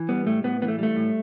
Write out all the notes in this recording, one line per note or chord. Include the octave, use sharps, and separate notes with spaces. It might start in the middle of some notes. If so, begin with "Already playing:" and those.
Already playing: E3
G3 B3
A2 A3
A2 B3
E3 B3
A3
G3 A3
A2